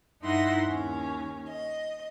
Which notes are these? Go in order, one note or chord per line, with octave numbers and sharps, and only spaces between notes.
G2 D#4 E4 F#5 C6 A#6
D#2 C#4
D#5